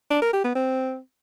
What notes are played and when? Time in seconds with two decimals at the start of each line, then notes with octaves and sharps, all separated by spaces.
0.11 D4
0.22 A#4
0.33 G4
0.44 B3
0.55 C4